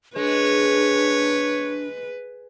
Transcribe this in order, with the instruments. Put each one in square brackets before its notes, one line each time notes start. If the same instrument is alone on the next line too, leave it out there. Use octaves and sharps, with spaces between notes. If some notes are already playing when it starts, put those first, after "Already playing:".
[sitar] G#3 [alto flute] D4 [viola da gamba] B4 [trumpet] C#5